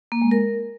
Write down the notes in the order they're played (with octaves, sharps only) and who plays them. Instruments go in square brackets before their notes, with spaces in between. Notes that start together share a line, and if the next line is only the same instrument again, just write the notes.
[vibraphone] A#3
G#3
A#4